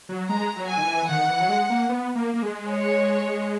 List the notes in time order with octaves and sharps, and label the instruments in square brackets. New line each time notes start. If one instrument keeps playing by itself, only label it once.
[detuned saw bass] F#3
[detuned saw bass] G#3 [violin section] A#5
[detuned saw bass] F#3
[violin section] G#5
[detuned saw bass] D#3
E3
[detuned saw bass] D#3 [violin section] F#5
[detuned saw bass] D#3
E3
F#3
G#3
A#3
B3
A#3
A#3
G#3
[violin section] C#5